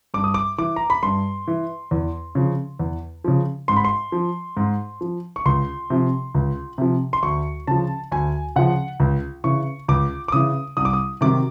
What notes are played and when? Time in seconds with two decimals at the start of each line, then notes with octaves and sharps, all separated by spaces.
0.14 G2 D6
0.24 D#6
0.34 D6
0.58 E3 D6
0.76 A#5
0.90 B5
1.03 G2 C6
1.48 E3
1.91 E2
2.35 C#3 F3
2.80 E2
3.24 C#3 F3
3.68 G#2 C6
3.76 B5
3.85 C6
4.12 F3
4.57 G#2
5.01 F3
5.36 C#6
5.45 C#2 C6
5.90 C3 F3
6.35 C#2
6.78 C3 F3
7.13 C6
7.23 D2 C#6
7.67 C#3 F3 A5
8.11 D2 G#5
8.56 C#3 F3 F#5
9.00 C#2
9.44 C#3 E3 C#6
9.88 C#2 D6
10.28 D6
10.32 C#3 E3 D#6
10.77 C2 D#6
10.85 D6
10.93 D#6
11.21 C3 D#3 F#3 D6